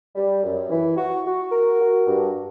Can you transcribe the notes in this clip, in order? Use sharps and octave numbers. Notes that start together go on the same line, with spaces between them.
G3
F#2
E3
F#4
F#4
A#4
F#4
G2